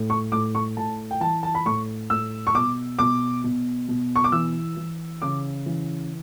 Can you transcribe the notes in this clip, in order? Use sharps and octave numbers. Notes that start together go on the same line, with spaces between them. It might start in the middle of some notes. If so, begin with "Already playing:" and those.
Already playing: A2
C#6
A2 D6
C#6
A2 A5
G5
E3 A5
A5
B5
A2 C#6
A2 E6
C#6
B2 D6
B2 D6
B2
B2
C#6
D6
E3 E6
E3
C#3 D6
E3